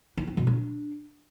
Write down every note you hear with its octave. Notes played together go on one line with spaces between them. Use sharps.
D#4
C4
B2
D4